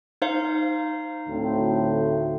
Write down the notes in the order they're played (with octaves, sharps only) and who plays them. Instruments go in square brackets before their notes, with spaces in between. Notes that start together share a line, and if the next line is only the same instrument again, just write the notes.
[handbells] D#4 C5 F5
[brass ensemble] D2 A2 C4